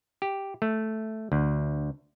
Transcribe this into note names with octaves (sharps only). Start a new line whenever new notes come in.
G4
A3
D2